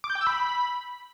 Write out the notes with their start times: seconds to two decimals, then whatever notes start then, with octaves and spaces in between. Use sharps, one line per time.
0.04 D6
0.10 G6
0.15 G5
0.21 E6
0.27 B5